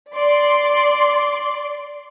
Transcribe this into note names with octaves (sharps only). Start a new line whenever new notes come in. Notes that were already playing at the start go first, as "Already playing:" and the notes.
D5 C6